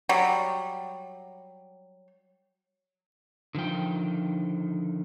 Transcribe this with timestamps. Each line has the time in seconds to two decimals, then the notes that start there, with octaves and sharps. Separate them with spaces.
0.09 F#3 G3
3.55 D3 D#3 F3 G5